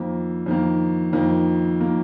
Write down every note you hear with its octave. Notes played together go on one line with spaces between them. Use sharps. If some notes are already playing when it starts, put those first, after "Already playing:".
Already playing: F2 D#3 A#3
F2 D#3 A#3
F2 D#3 A#3
D#3 A#3